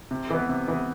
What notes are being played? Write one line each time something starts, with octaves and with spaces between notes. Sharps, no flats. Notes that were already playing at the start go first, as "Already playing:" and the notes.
C3
E3 B3
C3
E3 B3